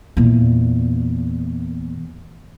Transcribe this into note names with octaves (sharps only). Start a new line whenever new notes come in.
E2 A#2